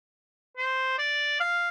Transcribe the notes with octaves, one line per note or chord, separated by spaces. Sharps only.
C5
D5
F5